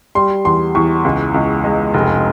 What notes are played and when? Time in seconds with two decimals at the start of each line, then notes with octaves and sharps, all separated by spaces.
0.15 G3 C6
0.45 E2 C6
0.75 E2 C#6
1.05 C#2
1.34 C#2
1.64 G#3
1.94 F1